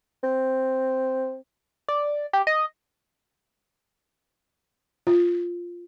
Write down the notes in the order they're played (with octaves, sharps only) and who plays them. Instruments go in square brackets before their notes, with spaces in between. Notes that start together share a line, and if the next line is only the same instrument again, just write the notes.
[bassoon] C4
[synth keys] D5
G4
D#5
[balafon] F4